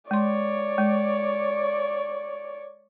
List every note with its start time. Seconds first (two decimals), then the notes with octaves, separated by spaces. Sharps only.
0.11 G#3 C#5 D5 C6
0.78 G#3